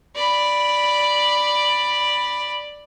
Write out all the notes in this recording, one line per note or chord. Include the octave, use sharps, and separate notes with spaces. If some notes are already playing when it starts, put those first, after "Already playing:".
D5 B5